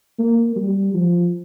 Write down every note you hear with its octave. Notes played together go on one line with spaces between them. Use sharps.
A#3
G3
F3